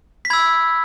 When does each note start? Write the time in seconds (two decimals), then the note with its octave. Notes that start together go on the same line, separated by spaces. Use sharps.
0.25 B6
0.30 B5 E6 G#6